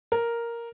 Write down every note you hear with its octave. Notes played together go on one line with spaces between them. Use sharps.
A#4